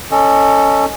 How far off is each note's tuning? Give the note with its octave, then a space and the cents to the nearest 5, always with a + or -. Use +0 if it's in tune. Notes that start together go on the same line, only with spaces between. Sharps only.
C#4 +0 A4 +20 D#5 -10